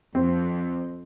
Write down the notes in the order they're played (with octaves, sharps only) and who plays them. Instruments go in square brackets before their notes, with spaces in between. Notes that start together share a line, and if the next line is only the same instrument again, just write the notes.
[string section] F2 [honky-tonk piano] C4